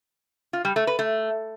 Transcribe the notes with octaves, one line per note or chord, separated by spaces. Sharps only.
F4
G3
A3
B4
A3